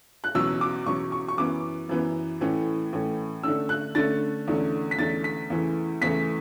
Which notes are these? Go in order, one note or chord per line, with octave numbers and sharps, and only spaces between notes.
F#6
E2 B2 F#3 C#4 E6
D6
E2 B2 F#3 C#4 C#6
C#6
C#6
F#2 E3 B3 D6
F#2 E3 B3
A2 E3 A3 C#4
A2 E3 A3 C#4
D3 A3 C#4 E6
F#6
D3 A3 C#4 A6
E2 D3 A3 C#4
B6
E2 D3 A3 C#4 A6
B6
E2 C#3 E3 A3
E2 C#3 E3 A3 B6